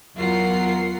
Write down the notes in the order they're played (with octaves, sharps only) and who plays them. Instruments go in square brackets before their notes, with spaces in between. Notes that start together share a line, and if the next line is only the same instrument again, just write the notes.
[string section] E2 F#3 F4 A#4 F#5 C7